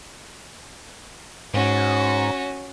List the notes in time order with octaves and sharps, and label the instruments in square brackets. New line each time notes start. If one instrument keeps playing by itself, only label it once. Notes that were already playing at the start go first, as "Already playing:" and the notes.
[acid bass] G#2 [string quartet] C#4 F#4